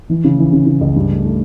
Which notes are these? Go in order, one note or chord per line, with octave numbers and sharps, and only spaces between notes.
E3
C#3
E3
C#3
C#3
C#2
G2
A3
A3